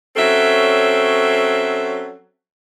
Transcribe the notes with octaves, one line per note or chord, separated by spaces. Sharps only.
F#3 C4 C#4 A4 E5